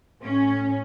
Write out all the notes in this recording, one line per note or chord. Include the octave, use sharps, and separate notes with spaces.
A2 C#4